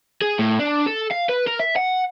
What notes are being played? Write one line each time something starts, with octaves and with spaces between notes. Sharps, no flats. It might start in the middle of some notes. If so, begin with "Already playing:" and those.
G#4
A2
D4
A4
F5
B4
A#4
E5
F#5